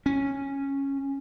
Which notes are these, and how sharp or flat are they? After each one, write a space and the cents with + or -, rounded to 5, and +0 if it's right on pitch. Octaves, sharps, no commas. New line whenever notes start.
C#4 -10